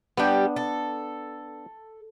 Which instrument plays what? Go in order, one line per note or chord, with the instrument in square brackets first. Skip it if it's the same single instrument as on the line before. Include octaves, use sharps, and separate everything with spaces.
[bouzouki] G3 G4 [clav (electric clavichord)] B3 D4
[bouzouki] A4